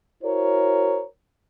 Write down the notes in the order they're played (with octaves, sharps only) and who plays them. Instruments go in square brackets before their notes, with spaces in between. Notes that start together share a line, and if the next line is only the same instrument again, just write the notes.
[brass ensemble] E4 F#4 A#4 C5 C#5